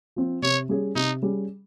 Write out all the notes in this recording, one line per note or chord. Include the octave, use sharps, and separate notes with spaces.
F3 C4
C3 C#5
G3 C#4 G#4
C3 D#4
G3 C#4 G#4